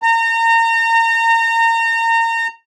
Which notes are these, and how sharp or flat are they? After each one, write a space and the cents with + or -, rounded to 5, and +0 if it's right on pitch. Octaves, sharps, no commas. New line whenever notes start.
A#5 -30